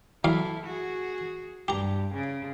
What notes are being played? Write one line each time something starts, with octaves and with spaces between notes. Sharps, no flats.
E2 F#3 E4 A4 F5
F#4 G#4
G2 G4 A#5
C#3